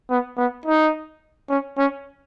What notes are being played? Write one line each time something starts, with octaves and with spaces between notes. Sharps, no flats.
B3
B3
D#4
C#4
C#4